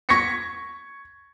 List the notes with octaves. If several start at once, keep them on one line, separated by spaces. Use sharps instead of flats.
C#6 G#6 A#6 B6 C#7